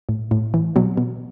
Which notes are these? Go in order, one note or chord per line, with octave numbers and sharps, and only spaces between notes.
A2
A2
E3
B2 F#3
B2